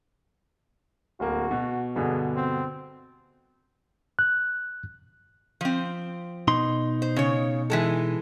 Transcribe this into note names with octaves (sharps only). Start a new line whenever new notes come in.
D1 A#3 F#4
B2
G2 B2 D3 G#4
C4
F#6
F3 C4
B2 D#4 C6
C5
C#3 C#5
E3 G#3 A4